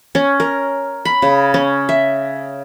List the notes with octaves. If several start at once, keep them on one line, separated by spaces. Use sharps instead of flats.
C#4
A#4
B5
C#3
C#4
E5